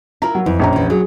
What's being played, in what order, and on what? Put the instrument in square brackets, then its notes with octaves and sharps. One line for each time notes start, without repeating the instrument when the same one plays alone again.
[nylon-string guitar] E4 F4 A#4 [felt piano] A#5
[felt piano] F#3
[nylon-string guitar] F2 [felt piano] E3
[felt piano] A#1 C#4 A#5
[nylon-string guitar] E2 E3
[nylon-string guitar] F#3 [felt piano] G#4